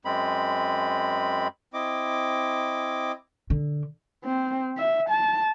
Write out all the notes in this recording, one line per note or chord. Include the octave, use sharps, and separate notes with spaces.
F#2 G#3 C4 B5
C4 E4 D#5 D6
D3
C4
E5
A5